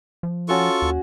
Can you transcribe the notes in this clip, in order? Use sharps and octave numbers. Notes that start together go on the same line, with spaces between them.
F3
C#4 F4 F#4 A4 F#5 C#6
D#2